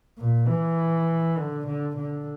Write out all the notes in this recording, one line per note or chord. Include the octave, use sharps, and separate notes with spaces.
A#2
E3
D3
D3
D3